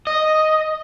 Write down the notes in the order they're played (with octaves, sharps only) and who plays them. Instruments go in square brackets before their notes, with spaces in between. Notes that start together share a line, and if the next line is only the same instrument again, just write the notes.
[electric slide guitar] D#5